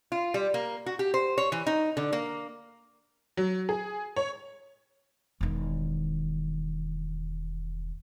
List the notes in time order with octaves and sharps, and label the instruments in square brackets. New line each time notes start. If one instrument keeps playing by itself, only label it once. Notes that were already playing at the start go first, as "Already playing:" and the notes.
[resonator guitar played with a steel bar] F4
G3
A#3
F#4
G4
C5
C#5
E3
D#4
D3
A#3
[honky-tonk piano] F#3
G#4
C#5
[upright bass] E1 D#3